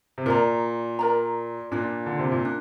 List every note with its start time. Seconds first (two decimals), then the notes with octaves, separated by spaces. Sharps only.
0.18 C3
0.26 A#2 A#4 D5 A#5
0.99 A#4 D5 A#5
1.72 A#2 D4 F4 D5
2.06 D3
2.19 C3
2.32 A#2
2.45 D4